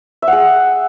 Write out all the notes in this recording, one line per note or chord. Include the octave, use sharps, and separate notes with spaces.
E5
F#5
G#4